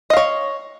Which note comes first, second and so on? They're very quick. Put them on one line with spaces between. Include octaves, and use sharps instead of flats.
D#5 F5 C#5